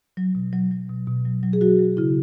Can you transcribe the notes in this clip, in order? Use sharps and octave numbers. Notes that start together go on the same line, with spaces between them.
F#3
B2
F#3
F#3
B2
B2
F#3
F#3
G#4
F#3 F#4
F#3
C#3 E4